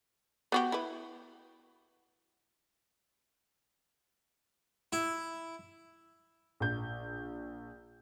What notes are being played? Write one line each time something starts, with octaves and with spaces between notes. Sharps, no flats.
B3 F#4 G4
E4 B4
E4
A#1 G6